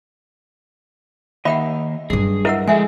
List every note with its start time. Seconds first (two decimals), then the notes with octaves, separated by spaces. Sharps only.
1.45 D#3 A#3 D#5 E5 F#5 G5 B5
2.10 G2 F#3 G#4
2.45 E4 A#4 D#5 E5 F#5 E6
2.67 F3 G#3 G#4 A4 E5 G#5